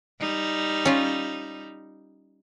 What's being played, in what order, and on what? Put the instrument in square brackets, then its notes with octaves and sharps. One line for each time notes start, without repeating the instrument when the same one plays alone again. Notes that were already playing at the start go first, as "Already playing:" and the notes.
[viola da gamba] G3 D#4
[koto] C#4 F4